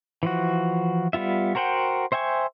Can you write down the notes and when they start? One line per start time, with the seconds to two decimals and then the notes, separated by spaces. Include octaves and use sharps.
0.23 E3 F3 F#4
1.13 G3 B3 F4 E5
1.55 F#4 A#4 C5 F#5 G5
2.12 C5 E5 G5 G#5 C#6